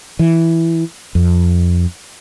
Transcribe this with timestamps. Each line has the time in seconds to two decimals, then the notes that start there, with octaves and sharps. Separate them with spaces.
0.19 E3
1.15 F2